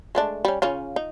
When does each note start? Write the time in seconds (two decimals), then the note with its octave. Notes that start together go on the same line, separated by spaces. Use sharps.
0.15 G#3 A3 D4
0.45 G3 C#4
0.62 C#3 C#4 F4
0.96 D#4